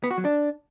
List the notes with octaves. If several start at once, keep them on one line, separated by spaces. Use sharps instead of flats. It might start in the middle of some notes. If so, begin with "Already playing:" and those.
B3
F#4
F#3
D4